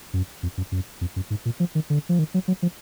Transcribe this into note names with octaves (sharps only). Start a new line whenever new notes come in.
F#2
F2
F#2
F#2
F2
F#2
G#2
A#2
F3
D#3
D3
F3
D#3
F#3
F#3
F3